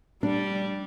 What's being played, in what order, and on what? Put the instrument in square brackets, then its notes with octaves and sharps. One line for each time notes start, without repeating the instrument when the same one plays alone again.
[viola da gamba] G3 [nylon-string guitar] D4